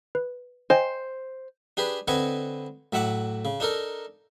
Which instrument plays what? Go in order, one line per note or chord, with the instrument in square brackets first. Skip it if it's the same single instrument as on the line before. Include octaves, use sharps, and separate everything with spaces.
[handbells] B4
[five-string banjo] C5 [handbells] D#5 G5 G#5
[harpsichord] D4 G4 G#4 B4
D3 C4 B4 D#5 G#5 C#6
A2 F#3 E5 F#5 D6
C#3
D4 D#4 A4 A#4